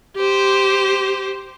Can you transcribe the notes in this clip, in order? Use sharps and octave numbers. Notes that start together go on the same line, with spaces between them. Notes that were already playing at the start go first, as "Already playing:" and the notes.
G4 C5